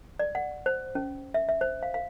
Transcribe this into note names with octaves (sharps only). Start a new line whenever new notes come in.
D5
F#5
C5
C#4
E5
E5
C5
F5
F5